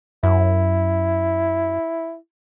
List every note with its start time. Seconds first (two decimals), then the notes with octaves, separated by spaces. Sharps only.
0.23 F#2 E4